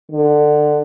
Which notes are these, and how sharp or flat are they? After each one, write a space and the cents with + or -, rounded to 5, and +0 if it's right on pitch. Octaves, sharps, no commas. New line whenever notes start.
D3 +20